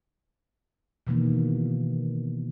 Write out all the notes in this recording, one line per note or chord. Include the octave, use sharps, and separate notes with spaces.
B2 D#3 E3 A#3